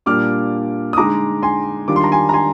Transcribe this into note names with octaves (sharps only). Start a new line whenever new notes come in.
A#2 G3 A#3 D4 D6 F6
D#6
D3 G#3 D#4 A#5 D6
G#5 C6
D#3 G3 D4 F4 D6
C6
A#5
G#5 C6
A#5
G#5 C6